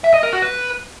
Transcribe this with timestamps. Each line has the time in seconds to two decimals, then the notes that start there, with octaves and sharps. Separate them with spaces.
0.04 E5
0.14 D#5
0.23 A#4
0.33 F#4
0.42 B4